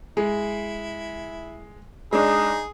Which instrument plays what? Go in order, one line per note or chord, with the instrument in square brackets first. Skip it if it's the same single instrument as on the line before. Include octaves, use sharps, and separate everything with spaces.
[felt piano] G#3 [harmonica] E4
[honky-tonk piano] G#3 D4 [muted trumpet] D#4 [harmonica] G#4